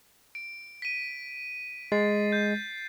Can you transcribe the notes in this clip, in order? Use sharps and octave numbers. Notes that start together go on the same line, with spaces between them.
D7
B6 D#7
G#3 A6 C7
G6